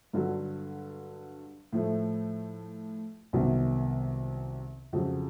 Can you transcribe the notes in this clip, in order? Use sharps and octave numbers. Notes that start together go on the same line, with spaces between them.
G2 D3 F#3
A2 F3 A3
C2 C3 D#3 F#3 B3
F2 C#3 F#3